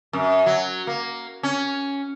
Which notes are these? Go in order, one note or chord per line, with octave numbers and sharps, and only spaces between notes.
F#2
F#3
A#3
C#4